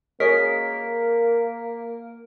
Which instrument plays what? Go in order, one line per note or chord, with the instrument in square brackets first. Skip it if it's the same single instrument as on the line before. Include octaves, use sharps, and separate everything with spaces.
[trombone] A#3 [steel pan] G#4 C#5 D#5 [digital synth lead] A#4 [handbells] B6